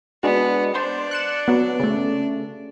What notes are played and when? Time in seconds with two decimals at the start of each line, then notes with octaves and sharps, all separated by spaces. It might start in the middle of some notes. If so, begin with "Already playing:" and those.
0.23 G#3 B3 D4 F#4
0.75 D4 C5 D5
1.11 F#6 C#7 E7
1.48 F#3 B3
1.80 C#3 A3